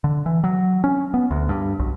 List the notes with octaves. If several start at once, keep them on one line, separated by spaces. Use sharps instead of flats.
D3
E3
F#3
C#4
B3
D2
G2
B1